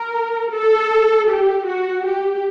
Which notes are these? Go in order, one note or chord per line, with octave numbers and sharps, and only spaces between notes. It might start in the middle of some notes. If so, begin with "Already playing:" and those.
Already playing: A#4
A4
G4
F#4
G4